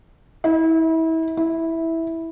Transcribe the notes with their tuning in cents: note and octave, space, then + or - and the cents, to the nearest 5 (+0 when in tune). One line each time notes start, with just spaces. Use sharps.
E4 -30
E4 -10